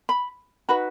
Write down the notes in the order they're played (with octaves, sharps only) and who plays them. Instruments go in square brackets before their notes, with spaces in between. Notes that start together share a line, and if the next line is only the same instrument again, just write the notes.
[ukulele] B5
D#4 F#4 B4 B5